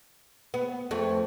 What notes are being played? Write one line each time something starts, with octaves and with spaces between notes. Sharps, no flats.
B3
F2 A3